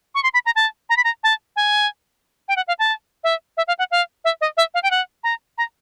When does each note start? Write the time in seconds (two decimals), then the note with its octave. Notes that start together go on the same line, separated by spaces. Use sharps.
0.15 C#6
0.23 C6
0.34 B5
0.46 A#5
0.56 A5
0.89 A#5
0.97 B5
1.04 A#5
1.23 A5
1.56 G#5
2.48 G5
2.56 F#5
2.68 F5
2.79 A5
3.24 E5
3.57 E5
3.68 F5
3.79 F#5
3.91 F5
4.24 E5
4.41 D#5
4.57 E5
4.74 F5
4.83 G5
4.91 F#5
5.24 A#5
5.58 A#5